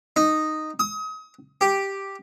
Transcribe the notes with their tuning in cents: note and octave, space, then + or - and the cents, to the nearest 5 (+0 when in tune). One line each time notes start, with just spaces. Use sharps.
D#4 -5
D#6 +35
G4 +0